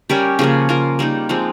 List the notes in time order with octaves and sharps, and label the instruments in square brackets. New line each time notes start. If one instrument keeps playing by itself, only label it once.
[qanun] G3 C#4 G4 A#4
C#3 F3 A#3 C#4
A#3 F4 A#4
G3 A#3 D#4
F3 G#3 C4